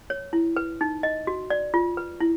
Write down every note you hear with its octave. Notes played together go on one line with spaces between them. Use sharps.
C#5
E4
B4
D#4
D#5
F#4
D5
F4
B4
E4